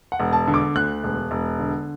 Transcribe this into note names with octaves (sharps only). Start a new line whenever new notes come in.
F#5
E1
A5
D3
D6
D2 F#6
E1
E1
D3